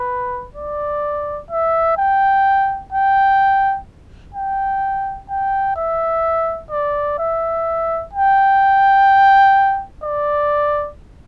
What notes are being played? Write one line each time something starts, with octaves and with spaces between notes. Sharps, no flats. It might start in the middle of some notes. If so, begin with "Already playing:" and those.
Already playing: B4
D5
E5
G5
G5
G5
G5
E5
D5
E5
G5
D5